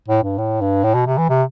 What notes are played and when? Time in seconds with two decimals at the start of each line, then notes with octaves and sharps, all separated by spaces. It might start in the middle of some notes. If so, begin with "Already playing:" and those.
0.08 A2
0.23 G2
0.38 A2
0.61 G2
0.84 A2
0.95 B2
1.07 C3
1.18 E3
1.29 C3